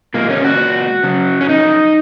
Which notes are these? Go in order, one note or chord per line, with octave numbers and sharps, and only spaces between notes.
A#2 G#3 A#3
C#4
F#4
C#3 F#3
C#4
D#4